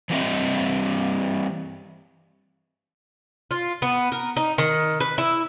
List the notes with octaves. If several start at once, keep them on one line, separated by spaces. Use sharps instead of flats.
E3 F#3 G3 C4 D#5 E5
F4
B3
A#4
D#4
D#3
B4
E4